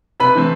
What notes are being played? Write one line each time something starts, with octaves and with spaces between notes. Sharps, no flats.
C3 B4 B5
E3 A3 C4